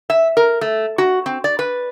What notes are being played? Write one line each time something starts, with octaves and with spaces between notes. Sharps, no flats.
E5
A#4
A3
F#4
C4
D5
B4